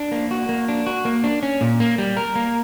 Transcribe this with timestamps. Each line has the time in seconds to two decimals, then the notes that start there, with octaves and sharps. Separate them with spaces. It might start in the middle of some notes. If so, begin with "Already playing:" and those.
Already playing: D4
0.12 A#3
0.31 F#4
0.49 A#3
0.69 D4
0.86 F#4
1.05 A#3
1.24 D4
1.43 C#4
1.61 A#2
1.80 A#3
1.98 G3
2.17 A#4
2.35 A#3